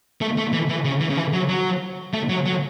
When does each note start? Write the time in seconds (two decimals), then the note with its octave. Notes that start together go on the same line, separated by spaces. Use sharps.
0.21 A3
0.37 A3
0.53 E3
0.69 E3
0.84 C#3
1.00 E3
1.10 C#3
1.17 E3
1.33 F#3
1.49 F#3
2.13 A3
2.29 F#3
2.46 F#3